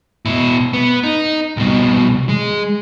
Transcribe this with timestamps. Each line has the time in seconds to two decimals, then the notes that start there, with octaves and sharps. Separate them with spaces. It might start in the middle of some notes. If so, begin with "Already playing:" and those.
0.25 B2 E4
0.73 B3
1.03 D#4
1.57 C2 B2
2.29 G#3